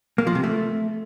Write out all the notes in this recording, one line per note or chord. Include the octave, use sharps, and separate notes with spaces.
A#3
F3
C3
A3